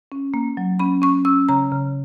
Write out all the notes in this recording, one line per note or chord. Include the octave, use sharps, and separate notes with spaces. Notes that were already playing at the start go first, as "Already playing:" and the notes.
C#4
A#3
F#3
C#4 B5
C#4 C#6
C#4 E6
C#3 A#5
C#3